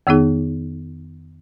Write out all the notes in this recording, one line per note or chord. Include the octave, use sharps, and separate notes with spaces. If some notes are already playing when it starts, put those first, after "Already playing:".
F2 D#3 B3 D#4 G#4